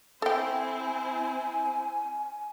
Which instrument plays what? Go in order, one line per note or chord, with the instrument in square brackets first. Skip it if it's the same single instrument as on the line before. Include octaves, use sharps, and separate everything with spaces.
[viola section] C4 E4 C5 [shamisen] A4 G5 [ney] G#5